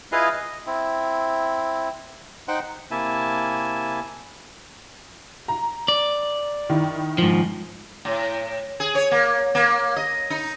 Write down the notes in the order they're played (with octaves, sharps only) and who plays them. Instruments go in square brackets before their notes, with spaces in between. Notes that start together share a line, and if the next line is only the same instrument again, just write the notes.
[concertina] E4 F4 G#4 B4 D#5 F5
D#5
C4 E4
D#4 C5 F#5 G5
[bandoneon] C3 A#3 E4 E5 G#5 A5
[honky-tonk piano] A#5
[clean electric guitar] D5
[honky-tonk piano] D#3 D#4 E4
[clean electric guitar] G#2 F3
[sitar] A2
G#4
C#5
A#3
A#3
D#5
D#4